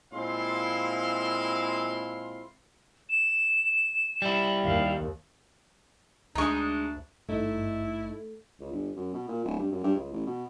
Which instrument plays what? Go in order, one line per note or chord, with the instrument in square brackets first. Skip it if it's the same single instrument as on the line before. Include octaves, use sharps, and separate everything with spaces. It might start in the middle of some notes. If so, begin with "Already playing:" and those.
[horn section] A#2 G#3 C4 E4 F5 C6
[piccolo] E7
[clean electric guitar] G3 E4
[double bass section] D#2 [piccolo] F5
[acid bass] D2 [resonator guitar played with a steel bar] G#3 D#4 [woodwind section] D4 [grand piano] A#5 C#6
[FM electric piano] G#1 G2 D#4 [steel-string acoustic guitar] A3 [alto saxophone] E4
[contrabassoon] C#2
G1
F#2
B2
A#2
D1
G2
F#2
G2
C#2
A1
B2